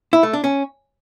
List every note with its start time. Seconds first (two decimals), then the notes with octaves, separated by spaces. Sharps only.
0.13 E4
0.23 A3
0.33 D4
0.44 C#4